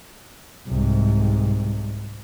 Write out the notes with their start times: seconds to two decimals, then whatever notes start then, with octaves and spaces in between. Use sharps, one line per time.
0.68 C2 G#2